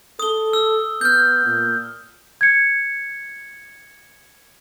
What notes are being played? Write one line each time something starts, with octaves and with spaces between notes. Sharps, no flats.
A4 D#6 G7
E6
B3 F6 G6
A#2
G#6 C#7